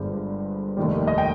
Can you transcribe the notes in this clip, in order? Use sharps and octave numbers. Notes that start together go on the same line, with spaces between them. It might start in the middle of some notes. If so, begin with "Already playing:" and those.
Already playing: G1 G2 D3 G#3 C5
F1 D#2 D#3 G3
D#5
G5